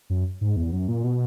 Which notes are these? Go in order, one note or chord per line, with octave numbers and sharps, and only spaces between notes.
F#2
G#2
E2
F#2
A#2
B2